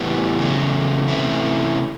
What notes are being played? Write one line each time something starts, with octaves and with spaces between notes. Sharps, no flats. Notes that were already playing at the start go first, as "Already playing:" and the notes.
Already playing: A2 E3 G3 B3
E2 C#3 F#3 A3
C3 E3 A3 C#4 E4